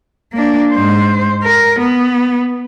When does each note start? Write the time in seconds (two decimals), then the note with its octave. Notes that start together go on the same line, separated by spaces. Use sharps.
0.33 A#3 D4
0.72 G#2 C5
1.44 A#4
1.80 B3